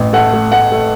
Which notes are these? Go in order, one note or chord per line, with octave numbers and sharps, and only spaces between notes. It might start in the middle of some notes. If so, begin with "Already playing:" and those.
Already playing: A1
A3 F#5
A3
A3 F#5
A3